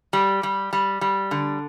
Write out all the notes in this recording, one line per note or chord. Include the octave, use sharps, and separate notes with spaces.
G3
G3
G3
G3
D3